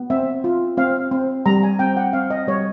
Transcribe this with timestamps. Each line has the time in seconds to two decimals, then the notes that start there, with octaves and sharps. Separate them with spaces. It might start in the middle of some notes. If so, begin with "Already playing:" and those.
Already playing: B3
0.10 C4 E5
0.44 F4
0.77 C4 F5
1.11 C4
1.46 G3 A#5
1.63 G#5
1.79 C4 G5
1.97 F#5
2.13 C4 F5
2.30 D#5
2.47 G3 C#5